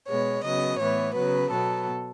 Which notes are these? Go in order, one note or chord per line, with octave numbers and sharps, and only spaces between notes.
B2 G#3 B3 C#5
C#3 F#3 B3 D#5
A2 E3 B3 C#5
C#3 F#3 B3 B4
B2 F#3 B3 A4